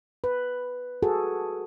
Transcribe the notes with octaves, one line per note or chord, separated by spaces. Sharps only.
B4
F#4 G#4 A4